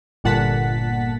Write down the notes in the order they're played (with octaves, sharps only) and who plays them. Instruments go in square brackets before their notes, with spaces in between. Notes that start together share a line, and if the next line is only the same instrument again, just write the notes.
[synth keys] G1 A#2 F#5 A5 B6